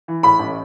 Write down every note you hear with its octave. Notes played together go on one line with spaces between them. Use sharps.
E3
A2 B5
A1